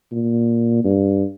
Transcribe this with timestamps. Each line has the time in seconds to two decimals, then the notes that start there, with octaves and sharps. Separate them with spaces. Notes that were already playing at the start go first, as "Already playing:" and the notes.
0.12 A#2
0.84 G2